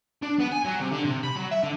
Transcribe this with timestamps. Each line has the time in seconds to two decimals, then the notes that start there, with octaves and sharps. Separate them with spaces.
0.23 D4
0.39 B3
0.52 G#5
0.65 F#3
0.80 C3
0.92 D3
1.05 C3
1.24 B5
1.36 F#3
1.51 E5
1.63 D3